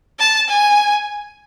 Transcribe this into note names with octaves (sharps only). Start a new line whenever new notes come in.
A5
G#5